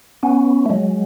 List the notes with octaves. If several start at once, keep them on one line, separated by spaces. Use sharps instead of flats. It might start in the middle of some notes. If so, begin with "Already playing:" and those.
B3 C#4
A3
F#3 G#3